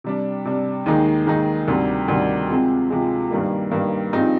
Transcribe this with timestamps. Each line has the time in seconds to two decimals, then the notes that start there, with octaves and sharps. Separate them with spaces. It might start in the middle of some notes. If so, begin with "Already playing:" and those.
0.04 C3 G3 D4
0.45 C3 G3 D4
0.86 D#2 D#3 G#3 D#4 G#4
1.27 D#2 D#3 G#3 D#4 G#4
1.67 D2 C3 D#3 G3 D4
2.08 D2 C3 D#3 G3 D4
2.49 C3 F3 G#3 C4
2.90 C3 F3 G#3 C4
3.30 G2 D#3 G3 A#3
3.71 G2 D#3 G3 A#3
4.13 G2 F3 C4 D#4 G#4